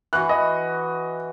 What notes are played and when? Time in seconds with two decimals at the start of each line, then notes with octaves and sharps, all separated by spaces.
0.13 E3 F#4 F#6
0.29 D#5